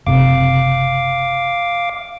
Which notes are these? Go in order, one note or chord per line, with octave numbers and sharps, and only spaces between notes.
F#1 C3 F5 D6